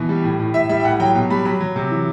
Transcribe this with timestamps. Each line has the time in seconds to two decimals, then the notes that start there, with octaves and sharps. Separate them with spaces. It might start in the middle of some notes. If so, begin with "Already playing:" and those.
Already playing: B2 E3
0.09 G3
0.24 A2
0.39 A2
0.54 A2 E5
0.69 G3 E5
0.80 G5
0.85 A2 F#5
1.00 F#3 G5
1.15 B2
1.30 G3 B5
1.45 F#3 B5
1.61 F#3
1.76 C3
1.91 E3